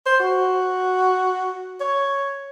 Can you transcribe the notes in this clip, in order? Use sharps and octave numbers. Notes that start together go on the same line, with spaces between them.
C5
F#4
C#5